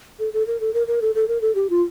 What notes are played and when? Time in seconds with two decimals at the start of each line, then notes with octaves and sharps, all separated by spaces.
0.19 A4
0.33 A4
0.47 A#4
0.60 A4
0.74 A#4
0.87 A#4
1.02 A4
1.15 A4
1.28 A#4
1.41 A4
1.55 G4
1.70 F4